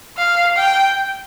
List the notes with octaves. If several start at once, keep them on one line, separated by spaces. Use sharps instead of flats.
F5
G5